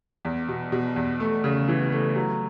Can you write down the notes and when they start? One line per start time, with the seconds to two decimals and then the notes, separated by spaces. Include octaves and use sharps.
0.25 E2
0.49 B2
0.72 B2
0.96 E2
1.20 A3
1.44 C#3
1.68 E3
1.92 A3
2.16 F#3